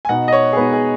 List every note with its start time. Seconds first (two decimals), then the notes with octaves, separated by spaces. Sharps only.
0.05 G#5
0.09 B2 B3 D#4 F#5
0.28 D#5
0.33 C#5
0.53 G#4
0.57 B2 B3 D#4 B4
0.73 G#4